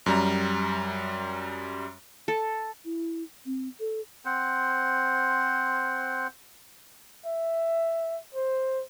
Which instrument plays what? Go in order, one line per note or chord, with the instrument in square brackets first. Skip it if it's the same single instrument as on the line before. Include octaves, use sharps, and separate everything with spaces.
[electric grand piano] F#2 G3 A#5
[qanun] A4
[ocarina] E4
C4
A4
[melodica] C4 C5 F#5
[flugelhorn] E5
C5